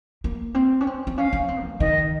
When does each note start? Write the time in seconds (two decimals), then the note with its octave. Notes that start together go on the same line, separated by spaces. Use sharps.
0.24 A#3
0.54 C4
0.81 C#4
0.87 C4
1.07 C4
1.17 C#4 F5
1.33 C#4
1.48 C4
1.64 D#3
1.80 D#3 D#5